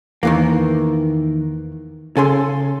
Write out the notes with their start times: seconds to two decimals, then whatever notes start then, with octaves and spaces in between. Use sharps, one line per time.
0.23 E2 D#3 E3 A#3
2.17 C#3 A4 G#5 C6